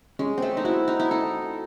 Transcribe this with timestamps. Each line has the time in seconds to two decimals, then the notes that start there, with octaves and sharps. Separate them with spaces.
0.19 G#3 C#4
0.38 A3 C4
0.57 D#4
0.65 E4 F#4
0.88 D#4
1.00 E4
1.11 D#4 A4